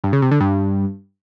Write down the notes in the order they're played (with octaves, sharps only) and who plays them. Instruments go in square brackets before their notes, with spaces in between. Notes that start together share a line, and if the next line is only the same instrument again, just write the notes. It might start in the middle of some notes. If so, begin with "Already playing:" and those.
[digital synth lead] G2
C#3
C3
D3
G2